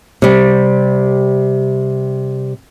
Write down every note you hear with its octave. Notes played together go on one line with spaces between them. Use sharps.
C3 G3